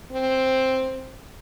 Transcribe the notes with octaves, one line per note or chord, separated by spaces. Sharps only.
C4